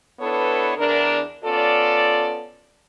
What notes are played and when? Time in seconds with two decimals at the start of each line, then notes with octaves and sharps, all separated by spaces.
0.20 B3 D4 E4 A4 B4 C#5
0.77 E2 D4 A#4
1.43 B3 C#4 F4 A4 D5